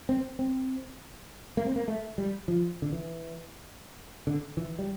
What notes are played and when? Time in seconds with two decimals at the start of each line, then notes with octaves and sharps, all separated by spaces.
0.09 C4
0.39 C4
1.57 A#3
1.66 C4
1.76 A#3
1.88 A3
2.18 G3
2.48 F3
2.82 D3
2.92 E3
4.27 D3
4.57 E3
4.79 G3